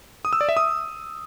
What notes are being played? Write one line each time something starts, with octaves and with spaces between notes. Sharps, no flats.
D#6
E6
D5
E5
D#6